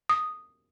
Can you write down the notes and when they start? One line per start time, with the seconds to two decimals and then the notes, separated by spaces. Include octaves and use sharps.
0.09 D#6